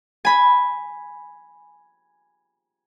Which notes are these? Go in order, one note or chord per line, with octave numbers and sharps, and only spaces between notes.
G#5 B5